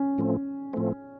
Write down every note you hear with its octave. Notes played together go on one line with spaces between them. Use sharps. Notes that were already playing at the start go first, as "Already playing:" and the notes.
Already playing: C#4
A2 F3 A3 C4
A2 F3 A3 C4